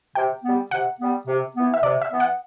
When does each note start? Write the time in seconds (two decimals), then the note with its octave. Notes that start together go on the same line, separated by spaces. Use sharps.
0.15 C3 G5
0.44 G3 B3
0.71 C3 F#5
0.99 G3 B3
1.27 C3
1.55 E3 B3
1.74 E5
1.83 C3 D5
2.02 E5
2.11 E3 B3
2.20 F#5